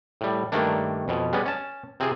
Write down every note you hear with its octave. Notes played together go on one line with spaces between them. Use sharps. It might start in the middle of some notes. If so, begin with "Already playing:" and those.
A2 G3
G2 D#3 A3 A#3 D4
F2 B2
G3 G#3 B3 C#4
C#4 A5
C3 C4 F4 G#4